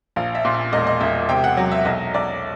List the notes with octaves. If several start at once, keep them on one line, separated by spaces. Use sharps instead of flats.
A#1 F5
E5
A#2
E5
E1 D#5
D#5
E1 E5
C3 G5
F#5
F#3
E5
B1 D#5
B1 D5